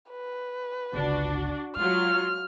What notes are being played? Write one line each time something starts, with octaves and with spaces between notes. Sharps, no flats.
B4
G1 C#2 D4 F#4
F#3 G#3 F4 F6